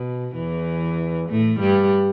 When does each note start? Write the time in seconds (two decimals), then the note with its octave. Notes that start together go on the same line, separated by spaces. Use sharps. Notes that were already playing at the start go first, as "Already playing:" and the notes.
Already playing: B2
0.35 E2 E3
1.29 A2 A3
1.60 G2 G3